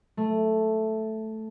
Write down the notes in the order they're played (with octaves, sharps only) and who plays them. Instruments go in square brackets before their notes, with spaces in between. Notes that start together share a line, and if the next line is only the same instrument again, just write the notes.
[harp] A3